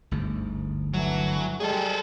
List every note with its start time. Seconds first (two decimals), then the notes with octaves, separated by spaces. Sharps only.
0.11 G1 D2 G#2
0.94 D3 E3 F#3
1.60 G3 G#3 G#4 A4